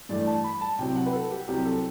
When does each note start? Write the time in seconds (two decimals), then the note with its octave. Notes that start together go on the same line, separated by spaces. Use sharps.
0.09 G2 E3 A3 D5
0.27 A5
0.44 B5
0.61 A5
0.78 C2 C3 F#3 C4 G5
0.96 F#5
1.06 B4
1.13 A4
1.31 G4
1.48 C2 C3 F#3 C4 G4
1.65 A4